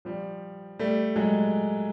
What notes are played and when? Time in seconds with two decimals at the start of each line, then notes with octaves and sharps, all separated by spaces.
0.05 F3 G3
0.79 G3 A3
1.16 F#3 G#3